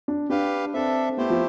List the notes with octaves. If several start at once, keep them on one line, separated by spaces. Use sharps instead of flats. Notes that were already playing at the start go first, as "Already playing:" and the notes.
D4
D4 G4 B4 F5
C4 D4 A4 E5
A3 B3 E4 G4 C5
F3